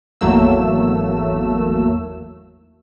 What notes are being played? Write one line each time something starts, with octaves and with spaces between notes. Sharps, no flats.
G#1 E2 F#3 A3 A#3 E6